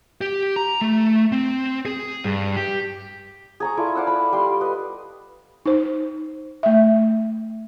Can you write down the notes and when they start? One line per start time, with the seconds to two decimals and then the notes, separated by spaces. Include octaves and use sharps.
0.21 G4
0.56 A#5
0.81 A3
1.32 C4
1.85 G#4
2.24 G2
2.56 G4
3.60 G#4 A#5 C#6
3.77 E4 F4 A4 D5
3.95 D5 F5 F#5 E6
4.07 B5
4.33 G3 C6
4.61 B4 D#5
5.66 D#4 C5
6.63 A3 E5